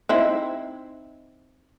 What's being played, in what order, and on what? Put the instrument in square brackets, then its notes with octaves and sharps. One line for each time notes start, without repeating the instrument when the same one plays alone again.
[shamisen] C4 D#4 E4